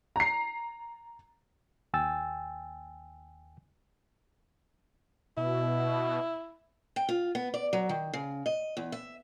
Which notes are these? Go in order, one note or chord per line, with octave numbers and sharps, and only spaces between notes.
A#5 C7
D#2 G5 G#5 E6 A6
B2 E4
G5
F4
B3
D5
F#3
D#3
C#3
D#5
E2
E5